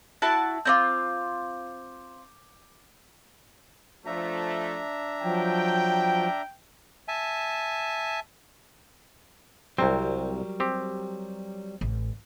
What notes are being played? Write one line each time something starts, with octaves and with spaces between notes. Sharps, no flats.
E4 F#4 A5
C4 D#4 F4 D6 G6
F3 A3 D4 E5 A#5
F3 F#3 G5
E5 G#5 A5
C2 F#3 G3 C4 A#4
C4 G4
A1